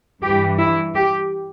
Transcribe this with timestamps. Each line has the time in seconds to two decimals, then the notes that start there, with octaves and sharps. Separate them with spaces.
0.21 G2 E3 G4
0.59 E4
0.95 G4